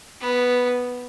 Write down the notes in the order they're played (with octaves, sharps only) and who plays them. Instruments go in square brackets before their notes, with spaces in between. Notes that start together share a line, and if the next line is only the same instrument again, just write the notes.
[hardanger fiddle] B3